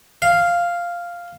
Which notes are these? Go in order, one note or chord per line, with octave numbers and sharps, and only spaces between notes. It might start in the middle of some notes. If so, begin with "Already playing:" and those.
F5